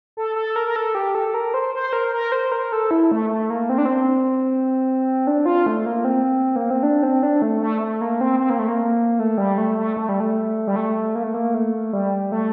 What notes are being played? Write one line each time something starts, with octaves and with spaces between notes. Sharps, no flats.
A4
A4
A#4
A#4
A4
G4
A4
A#4
C5
C5
A#4
A#4
C5
A#4
A4
E4
A3
A3
A#3
C4
D4
C4
D4
F4
A3
A#3
C4
A#3
C4
D4
C4
D4
A3
A3
A3
A#3
C4
C4
A#3
A3
A#3
A3
G3
A3
A3
A3
G3
A3
G3
A3
A#3
A3
A#3
A3
G3
A3